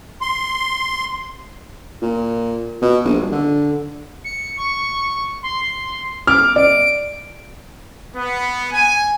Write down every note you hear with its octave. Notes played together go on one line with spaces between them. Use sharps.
C6
A#2
B2
A#1
G2
D3
C#7
C#6
C6
D6 F6
D5 D7
B3
G#5